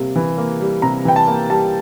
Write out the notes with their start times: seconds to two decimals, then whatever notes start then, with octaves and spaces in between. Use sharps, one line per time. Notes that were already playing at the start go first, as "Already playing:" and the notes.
Already playing: C3 G3 A#3
0.16 E3
0.38 A#3
0.61 G3
0.82 C3 A#5
1.05 E3 G5
1.16 A5
1.27 A#3
1.50 G3 A5